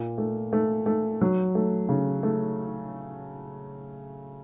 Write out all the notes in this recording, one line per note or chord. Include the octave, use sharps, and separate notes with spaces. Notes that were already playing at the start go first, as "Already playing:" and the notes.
Already playing: A#2
A3
A3
A3
F#3
A3
C#3
A3